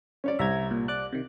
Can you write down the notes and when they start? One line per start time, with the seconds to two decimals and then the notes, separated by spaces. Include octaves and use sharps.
0.24 C#4 C#5 D5
0.39 C2 E5 A#5 G#6
0.71 A#2
0.88 D5 D6 F#6
1.13 C3 D#3